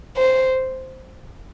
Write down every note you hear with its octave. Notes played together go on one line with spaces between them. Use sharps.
C5